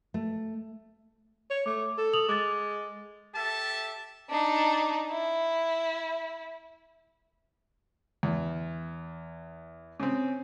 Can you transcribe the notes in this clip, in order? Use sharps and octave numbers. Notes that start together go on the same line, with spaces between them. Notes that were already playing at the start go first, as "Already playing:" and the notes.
A3
C#5
A3 D6
A4
D#6 F7 F#7
G#3 D6 A6
G4 A4 E5 A5
D4 D#4
E4
E2
C#3 C4